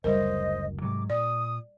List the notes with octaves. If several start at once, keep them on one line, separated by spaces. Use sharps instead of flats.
F#1 D2 G3 A#4 C5 D#5
G#2 C3 F#3 D6
A#2 D5 D#6